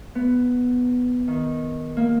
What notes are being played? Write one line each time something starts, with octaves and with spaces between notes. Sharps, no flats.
B3
D#3
A#3